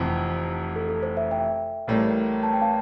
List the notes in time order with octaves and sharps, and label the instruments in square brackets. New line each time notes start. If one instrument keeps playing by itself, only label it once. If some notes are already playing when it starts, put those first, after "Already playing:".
Already playing: [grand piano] F1 F2 E3
[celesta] A4
A4
C5
C5 E5
E5 G5
[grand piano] A1 A2 G3 A#3
[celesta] A5
G5
F5 A5